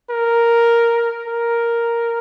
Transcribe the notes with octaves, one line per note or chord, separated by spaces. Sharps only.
A#4
A#4